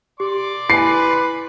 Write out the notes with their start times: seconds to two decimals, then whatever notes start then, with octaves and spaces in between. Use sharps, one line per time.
0.20 G4 D5 C6 D6
0.70 E4 B4 G#5 C7